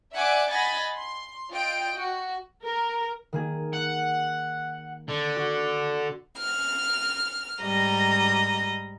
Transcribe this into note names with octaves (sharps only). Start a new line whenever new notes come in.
D5 E5 F#5 G#5 D6 F#6
D#5 F#5 G#5 B5 A6 A#6
C6
F4 D#5 G5 D7
F#4
A#4
D#3 A#3 G#4
F#5
D3
F#4
F6
G#2 G3 D#5 A#5